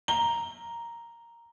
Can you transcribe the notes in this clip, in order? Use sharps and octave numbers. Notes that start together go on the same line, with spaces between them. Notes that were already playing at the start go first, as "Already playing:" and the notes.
A#5 G7